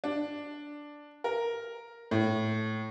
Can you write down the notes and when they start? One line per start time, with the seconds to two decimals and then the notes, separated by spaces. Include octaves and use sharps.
0.04 D4
1.24 A#4
2.11 A2